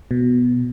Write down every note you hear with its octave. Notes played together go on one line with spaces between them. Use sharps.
B2